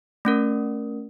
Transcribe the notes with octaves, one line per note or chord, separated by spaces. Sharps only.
A3 C#4 A#4